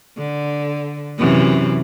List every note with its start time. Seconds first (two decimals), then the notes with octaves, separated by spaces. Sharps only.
0.18 D3
1.18 F#2 C3 E3